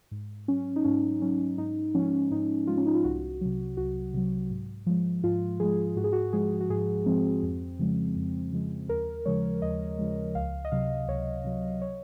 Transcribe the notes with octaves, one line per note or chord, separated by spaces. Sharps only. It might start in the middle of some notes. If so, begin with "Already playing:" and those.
G#2
F#3 C#4
D#4
G#2 C#4
F#3 C#4
G#2 D#4
F3 G#3 C#4
G#2 D#4
F3 G#3 F4
C#4
D#4
F4
C2 F#4
C3 F#3
C2 F#4
C3 F#3
G#2
F3 G#3
G#2 F4
F3 G#3 G#4
G#2 F#4
G#4
F#4
F3 G#3 G#4
F#4
G#2 G#4
F3 G#3 C4
F2
C#3 F3 G#3
F2
C#3 F3 G#3
D#2 A#4
C#3 F3 G#3 C#5
D#2 D#5
C#3 F3 G#3
C#2 F5
D#5
C3 F#3 F5
C#2 C#5
C3 F#3
C#5